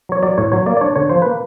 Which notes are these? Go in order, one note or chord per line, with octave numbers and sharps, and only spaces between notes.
F#3 C#5
F#3 D5
A2 C#5
F#3 C#5
A#3 D5
D5
D4 C#5
D3 C#5
F3 C5
A#3 B4